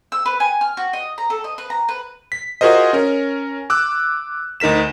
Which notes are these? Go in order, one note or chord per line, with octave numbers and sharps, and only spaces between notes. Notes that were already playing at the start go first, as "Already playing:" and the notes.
E6
B4
G#5
F6
F#4
D#5
A#5
A4
D#5
B4
A#5
B4
B6
F4 F#4 G#4 A#4 C5 D#5
C#4 A#4
D6 E6 F#6
D2 D#4 A#4 B6 E7